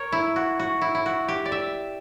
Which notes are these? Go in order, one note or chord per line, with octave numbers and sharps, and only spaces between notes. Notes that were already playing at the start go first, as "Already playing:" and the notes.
Already playing: A#4 C#5
E4
F#4
F#4
E4
E4
F#4
G4
D5
E5